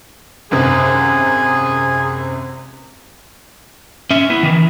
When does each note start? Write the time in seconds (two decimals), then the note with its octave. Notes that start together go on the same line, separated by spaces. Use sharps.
0.51 G#1 F#2 C3 G#4
4.11 C#4 E5
4.30 B3 E4
4.43 D#3 E3